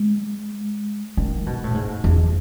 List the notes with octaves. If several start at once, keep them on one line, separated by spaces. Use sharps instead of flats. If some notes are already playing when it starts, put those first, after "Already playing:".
Already playing: G#3
D#3
B2
A2
G#2
E2